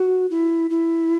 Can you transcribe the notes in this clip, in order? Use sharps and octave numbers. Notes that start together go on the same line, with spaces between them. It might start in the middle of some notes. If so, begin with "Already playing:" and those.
Already playing: F#4
E4
E4